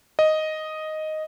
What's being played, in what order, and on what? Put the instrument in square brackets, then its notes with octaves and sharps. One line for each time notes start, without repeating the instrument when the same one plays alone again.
[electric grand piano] D#5